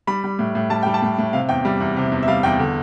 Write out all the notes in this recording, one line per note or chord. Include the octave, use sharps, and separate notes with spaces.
G3 B5
G3
A2
A2
G3 A5
G3 G5
A5
A2
A2
C3 F5
E2 G5
G3
E2
C3
E2
E5
G3 F5
E2 G5
D3